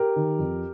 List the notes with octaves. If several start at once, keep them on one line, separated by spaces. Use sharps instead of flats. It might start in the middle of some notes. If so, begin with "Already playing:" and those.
Already playing: G4 A#4
D#3
F2